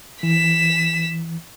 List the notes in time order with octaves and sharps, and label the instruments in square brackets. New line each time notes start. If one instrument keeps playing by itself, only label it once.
[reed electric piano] E3 [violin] B6 E7